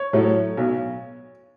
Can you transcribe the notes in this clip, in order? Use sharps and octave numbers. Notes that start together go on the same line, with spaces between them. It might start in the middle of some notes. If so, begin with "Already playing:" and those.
Already playing: C#5
A2 F#3 A3
B1